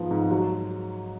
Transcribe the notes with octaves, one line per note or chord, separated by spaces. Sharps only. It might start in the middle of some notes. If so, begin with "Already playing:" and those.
Already playing: G#2 F3 G#3 B3
G#2
F#3